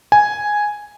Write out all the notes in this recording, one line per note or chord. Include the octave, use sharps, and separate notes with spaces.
G#5